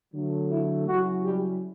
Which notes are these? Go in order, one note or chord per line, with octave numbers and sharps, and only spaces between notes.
D3 F#3 A3
E4
C#3 F#3 C#4 E4 F#4
G3 G4